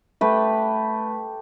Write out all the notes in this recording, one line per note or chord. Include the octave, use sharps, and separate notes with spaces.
A3 G4 B4